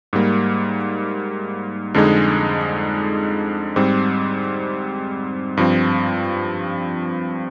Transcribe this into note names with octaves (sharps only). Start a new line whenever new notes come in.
G#2 G3 A#3
F2 D3 G#3 D#4 G#4
G#2 G3 C4
G2 F3 C4